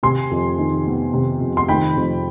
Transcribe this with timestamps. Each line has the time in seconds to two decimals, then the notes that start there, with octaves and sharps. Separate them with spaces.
0.03 C3 G#5 C6
0.31 F2
0.59 D#3
0.86 B3
1.13 C3
1.41 F2
1.57 C6
1.68 D#3 G5 B5
1.96 F2